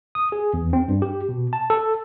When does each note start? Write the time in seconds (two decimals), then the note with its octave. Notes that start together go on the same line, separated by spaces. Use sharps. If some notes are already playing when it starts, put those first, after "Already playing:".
0.15 D#6
0.32 G#4
0.54 E2
0.73 C4
0.88 G2
1.02 G4
1.29 B2
1.53 A5
1.70 A4